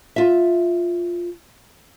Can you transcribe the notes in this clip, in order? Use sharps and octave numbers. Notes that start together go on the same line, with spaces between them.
F4 E5